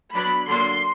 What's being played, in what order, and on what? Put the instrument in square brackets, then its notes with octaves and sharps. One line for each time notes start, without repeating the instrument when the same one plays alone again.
[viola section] F#3 B3 D4 B5
D3 F#3 A#3 D4 C6